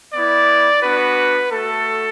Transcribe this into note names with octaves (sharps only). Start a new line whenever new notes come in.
B3 E4 D5
B3 D4 F#4 B4
A3 F#4 A4